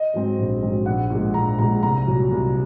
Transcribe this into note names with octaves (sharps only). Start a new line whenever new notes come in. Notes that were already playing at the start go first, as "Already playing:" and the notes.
Already playing: D#5
G#2 F#3 C4
A#1
G#2 F#3 C4
A#1 F#5
A#2 G#3
A#1 A#5
A#2 G#3 A#5
C2 A#5
A#2 F#3
C2